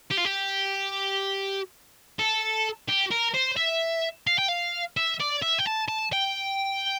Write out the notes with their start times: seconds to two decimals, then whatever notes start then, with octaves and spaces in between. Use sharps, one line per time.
0.11 G4
0.17 F4
0.25 G4
2.19 A4
2.89 G4
3.11 A#4
3.34 C5
3.57 E5
4.27 F5
4.39 G5
4.48 F5
4.97 E5
5.20 D5
5.42 E5
5.58 G5
5.66 A5
5.88 A5
6.13 G5